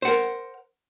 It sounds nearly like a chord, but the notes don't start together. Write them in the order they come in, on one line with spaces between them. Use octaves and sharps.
C5 F#5 A#4